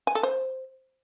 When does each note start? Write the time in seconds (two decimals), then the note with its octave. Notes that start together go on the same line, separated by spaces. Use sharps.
0.07 G#5
0.15 A4
0.23 C5